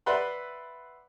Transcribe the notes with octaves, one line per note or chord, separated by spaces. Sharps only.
B4 D5 E5 F#5 C6